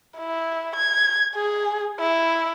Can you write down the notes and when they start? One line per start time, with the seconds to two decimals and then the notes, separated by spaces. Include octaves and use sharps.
0.18 E4
0.76 G#6
1.35 G#4
2.00 E4